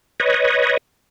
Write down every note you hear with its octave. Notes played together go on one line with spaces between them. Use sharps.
B4 C#5 D#5